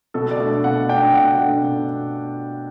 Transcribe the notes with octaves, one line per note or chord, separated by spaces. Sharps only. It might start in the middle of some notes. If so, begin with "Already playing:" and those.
B2 A4
D5
A3 D4
B2 F#5
A3 D4 G5
B2 F#5
A3 D4
B2